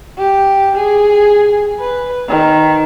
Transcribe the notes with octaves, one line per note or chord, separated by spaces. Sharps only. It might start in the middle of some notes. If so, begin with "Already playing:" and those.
G4
G#4
B4
D#3